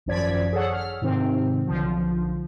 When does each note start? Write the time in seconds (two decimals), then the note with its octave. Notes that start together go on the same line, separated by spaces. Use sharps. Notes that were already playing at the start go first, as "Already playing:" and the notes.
0.06 G#1 F#2 F3 D5 G#6 B6
0.53 G#4 A4 C#5 F#5
0.73 F6
1.02 G#2 C3 D#3 C4
1.67 B1 D3 F3